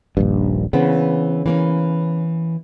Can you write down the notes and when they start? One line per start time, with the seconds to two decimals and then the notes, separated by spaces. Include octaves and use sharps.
0.17 D#1 A#1 G2
0.73 C#3 E3 B3 C4
1.46 E3 A#3 C#4